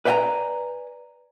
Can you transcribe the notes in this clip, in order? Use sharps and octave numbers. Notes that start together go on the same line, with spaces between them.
B4 D5 E5 G5 G#5 A#5